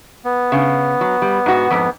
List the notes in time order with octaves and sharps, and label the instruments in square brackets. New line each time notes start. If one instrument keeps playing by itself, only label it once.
[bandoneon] B3
[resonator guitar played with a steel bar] C#3
F#3
G3
G#2 F#4
F2 G#2